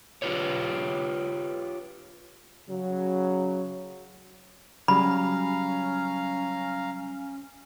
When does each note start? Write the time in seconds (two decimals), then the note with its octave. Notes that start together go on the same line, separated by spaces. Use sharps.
0.22 F4 G4 B4 C#5
2.69 C#3 F#3
4.88 C#3 F#3 G3 C#4 F5 A#5 B5